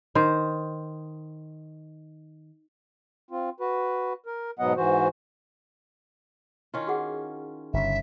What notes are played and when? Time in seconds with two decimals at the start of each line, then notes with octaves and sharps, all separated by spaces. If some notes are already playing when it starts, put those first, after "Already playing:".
0.15 D#3 C5
3.31 C4 F4
3.60 F#4 B4
4.26 A#4
4.59 G#2 B2 F#3 B3 D#5 F#5
4.77 G#2 E3 F#4 C5
6.74 D#3 C#4 E4 F4
6.87 F#4 G#4 F#5
7.73 G1 C#3 E5